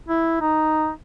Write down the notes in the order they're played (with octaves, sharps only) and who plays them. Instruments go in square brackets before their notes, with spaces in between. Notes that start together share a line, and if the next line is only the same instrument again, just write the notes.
[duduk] E4
D#4